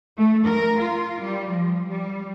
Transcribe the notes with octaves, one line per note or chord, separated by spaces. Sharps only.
A3
A#4
F4
G3
F3
G3